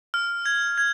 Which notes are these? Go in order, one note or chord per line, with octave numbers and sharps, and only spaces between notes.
F6
G#6
G#6